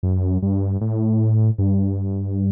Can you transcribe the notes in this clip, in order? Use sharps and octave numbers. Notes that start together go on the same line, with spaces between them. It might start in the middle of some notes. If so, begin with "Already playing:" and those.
F#2
G2
A2
G2